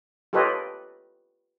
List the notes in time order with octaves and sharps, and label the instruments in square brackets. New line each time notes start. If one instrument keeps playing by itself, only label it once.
[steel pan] F4 G4 A4 B4 C#5 D#5